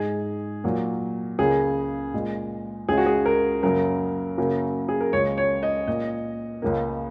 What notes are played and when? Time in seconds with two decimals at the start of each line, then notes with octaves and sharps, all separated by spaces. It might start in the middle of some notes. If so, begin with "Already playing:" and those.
Already playing: G#2 G#3 G#4
0.64 A#2 F#3 A#3
1.39 C#2 C#3 A#3 G#4
2.14 A#2 G#3
2.88 C#2 C#3 G#3 G#4
2.97 F#4
3.06 G#4
3.26 A#4
3.63 F#2 C#3 F#3 A#3 A#4
4.37 F#2 C#3 F#3 A#3
4.89 G#4
5.01 A#4
5.13 C#2 C#3 G#3 C#5
5.38 C#5
5.63 D#5
5.87 A#2 A#3 D#5
6.62 C#2 C#3 A#3